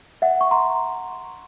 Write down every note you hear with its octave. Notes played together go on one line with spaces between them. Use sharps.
E5 F#5
C#6
A#5 C6